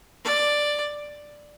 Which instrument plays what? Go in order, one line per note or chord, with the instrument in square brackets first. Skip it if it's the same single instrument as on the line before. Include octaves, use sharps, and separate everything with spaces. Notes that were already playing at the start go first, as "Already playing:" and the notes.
[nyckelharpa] D5